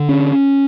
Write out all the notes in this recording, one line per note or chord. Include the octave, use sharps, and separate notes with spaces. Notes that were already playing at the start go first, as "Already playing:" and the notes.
Already playing: D3
C#4